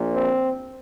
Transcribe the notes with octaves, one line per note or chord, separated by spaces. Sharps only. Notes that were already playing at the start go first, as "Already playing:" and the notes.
Already playing: A#1 A#2
C4